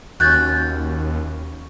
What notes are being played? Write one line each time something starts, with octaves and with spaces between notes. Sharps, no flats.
D#2 C#4 F#4 F#6 G6 A6